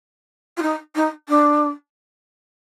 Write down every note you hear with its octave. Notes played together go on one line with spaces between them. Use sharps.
F4
D#4
D#4
D4